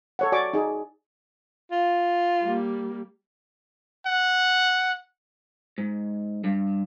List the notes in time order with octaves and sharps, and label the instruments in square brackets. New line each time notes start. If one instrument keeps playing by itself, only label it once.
[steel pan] A4 C#5 F#5
F#4 D5 G#5 C#6 D6
D#4 G#4
[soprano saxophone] F4
[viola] G3 A#3
[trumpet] F#5
[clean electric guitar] G#2
G2